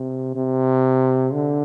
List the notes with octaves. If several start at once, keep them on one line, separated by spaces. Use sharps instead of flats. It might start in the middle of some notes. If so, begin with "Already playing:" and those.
Already playing: C3
C3
D3